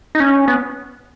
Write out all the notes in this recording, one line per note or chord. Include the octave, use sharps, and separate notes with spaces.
D#4
C#4
B3